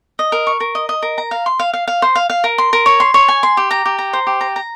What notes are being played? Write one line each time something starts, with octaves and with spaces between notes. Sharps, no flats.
D#5
A#4
C#6
A#4
D#5
D#5
A#4
A#5
F5
C6
F5
F5
F5
C5
F5
F5
A#4
C6
A#4
C#5
C6
C#5
G#5
C6
G4
A#5
G4
A#5
C5
G4
A#5
A#5